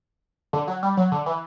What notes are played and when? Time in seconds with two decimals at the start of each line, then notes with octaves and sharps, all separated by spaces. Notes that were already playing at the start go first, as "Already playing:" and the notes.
0.53 D3
0.68 F#3
0.83 G3
0.97 F#3
1.12 D3
1.26 E3